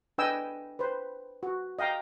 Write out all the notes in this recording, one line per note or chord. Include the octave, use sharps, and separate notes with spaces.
D4 B4 D#5 G5 G#5 E6
B4 C5
F#4
D#5 F5 G5 A#5